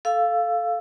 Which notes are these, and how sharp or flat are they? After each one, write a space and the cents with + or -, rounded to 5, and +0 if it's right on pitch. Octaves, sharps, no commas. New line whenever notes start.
A4 -10 F5 +0 E6 +15